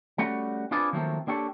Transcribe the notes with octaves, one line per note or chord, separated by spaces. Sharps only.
G3 A3 C#4 F#4
C4 D4 F4 G#4 B4 D5
D#3 F3 F#3 A3 A#3 C4
A#3 D4 G4 A4 C#5